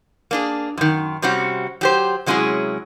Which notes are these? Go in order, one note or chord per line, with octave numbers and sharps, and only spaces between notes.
A#3 D4 G#4
F#2 D#3
C3 G3 C4 C#4 F#4
F#3 G4 C5
C3 F#3 G#3 C#4 E4 G#4